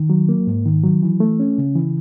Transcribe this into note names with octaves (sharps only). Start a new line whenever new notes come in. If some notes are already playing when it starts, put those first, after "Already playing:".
Already playing: D#3
F#3
A#3
G#2
D#3
F#3
E3
A3
C#4
C#3
E3